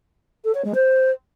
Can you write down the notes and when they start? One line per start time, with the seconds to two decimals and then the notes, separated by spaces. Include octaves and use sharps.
0.44 A4
0.54 C#5
0.64 G#3
0.74 C5